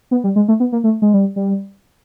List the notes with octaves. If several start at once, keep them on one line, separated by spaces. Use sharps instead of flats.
B3
G3
G#3
A3
B3
A#3
A3
G#3
G3
G3